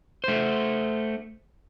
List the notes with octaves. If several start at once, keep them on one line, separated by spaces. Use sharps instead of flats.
A3 C5